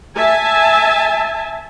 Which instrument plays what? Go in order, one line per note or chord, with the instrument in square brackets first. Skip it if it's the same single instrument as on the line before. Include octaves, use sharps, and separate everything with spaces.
[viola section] E5 G#5 A5